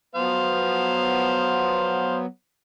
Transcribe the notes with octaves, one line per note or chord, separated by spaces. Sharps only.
F#3 B3 C5 F5